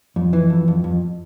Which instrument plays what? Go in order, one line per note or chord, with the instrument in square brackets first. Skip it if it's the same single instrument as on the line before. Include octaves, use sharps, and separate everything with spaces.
[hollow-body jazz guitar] F2
E3
F2
F2
F2